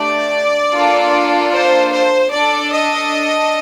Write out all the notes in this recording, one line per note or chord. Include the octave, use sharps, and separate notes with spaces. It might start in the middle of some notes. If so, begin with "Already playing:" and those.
Already playing: A3 D4 G4 D5
A#3 D4 F4 A4
C5
C5
D4 A4 D5
D#5